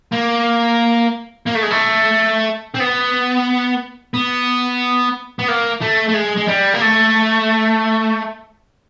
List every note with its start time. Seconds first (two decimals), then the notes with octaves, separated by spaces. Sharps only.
0.12 A#3
1.46 A#3
1.55 A3
1.62 G#3
1.70 A3
2.74 C4
2.80 B3
4.14 B3
5.39 B3
5.48 A#3
5.81 A3
6.09 A3
6.14 G#3
6.37 G#3
6.48 G3
6.74 A#3
6.82 A3